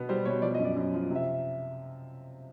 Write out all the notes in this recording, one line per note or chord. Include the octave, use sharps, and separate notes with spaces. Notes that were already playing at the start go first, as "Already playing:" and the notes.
Already playing: B2 B3
G3 C5
B2 C#5
F3 D5
D#5
F#2
D5
F#2
F3
C3 E5